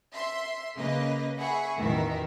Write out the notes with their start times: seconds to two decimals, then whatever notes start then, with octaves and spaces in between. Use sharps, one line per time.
0.13 E5 C6
0.75 C#3 A#3 B4 D#5
1.36 G#4 E5 F#5 B5 C#6
1.79 A1 E2 B2 D#3 A#4 E5